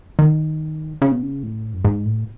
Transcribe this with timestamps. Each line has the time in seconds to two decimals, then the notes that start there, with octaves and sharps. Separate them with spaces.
0.19 D#3
1.02 C#3
1.12 B2
1.23 C#3
1.43 A2
1.74 F#2
1.85 G#2
2.06 A2